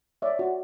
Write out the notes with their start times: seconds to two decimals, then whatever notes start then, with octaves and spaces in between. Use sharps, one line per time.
0.22 C#5 D5 E5
0.39 F#4